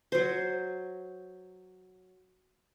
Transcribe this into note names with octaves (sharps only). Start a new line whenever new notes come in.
F#3 C5